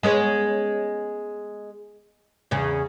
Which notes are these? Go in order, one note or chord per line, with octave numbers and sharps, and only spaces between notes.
G#3 B3 C#4
E2 C#3